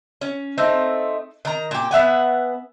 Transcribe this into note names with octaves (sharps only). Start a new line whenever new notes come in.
C#4
A3 C4 D#4
D#3 A#5
A#2 G4
B3 E5 F#5 G#5